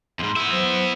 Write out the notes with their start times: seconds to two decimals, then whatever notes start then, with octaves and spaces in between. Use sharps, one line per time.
0.19 E2 G#2 B5 C6
0.36 B3 E4
0.51 F#3 C5